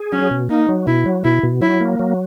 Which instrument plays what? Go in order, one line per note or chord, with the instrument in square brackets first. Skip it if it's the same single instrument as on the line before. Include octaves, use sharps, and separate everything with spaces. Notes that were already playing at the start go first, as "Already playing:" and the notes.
Already playing: [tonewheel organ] G#4
[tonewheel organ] F#3 [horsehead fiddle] C#4
[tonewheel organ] B2
[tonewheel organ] A#3 [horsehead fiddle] D#4
[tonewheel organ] F#3
[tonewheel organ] B2 [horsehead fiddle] E4
[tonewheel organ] F#3
[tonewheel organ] B2 [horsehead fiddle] E4
[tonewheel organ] B2
[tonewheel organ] F#3 [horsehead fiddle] E4
[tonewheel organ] A#3
F#3